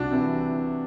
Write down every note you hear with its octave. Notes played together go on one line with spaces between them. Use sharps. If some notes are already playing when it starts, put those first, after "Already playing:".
Already playing: C2 D4 F#4
C3 E3